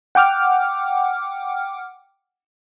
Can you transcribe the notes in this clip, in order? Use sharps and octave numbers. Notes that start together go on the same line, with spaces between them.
F#5 G5 D6 F6